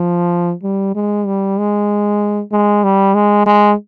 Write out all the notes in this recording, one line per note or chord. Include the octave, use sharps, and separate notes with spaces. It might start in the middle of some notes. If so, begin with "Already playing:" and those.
Already playing: F3
G3
G#3
G3
G#3
G#3
G3
G#3
G#3